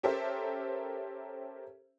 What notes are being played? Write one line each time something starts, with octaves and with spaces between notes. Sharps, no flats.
C#4 G4 A4 A#4 C5 E5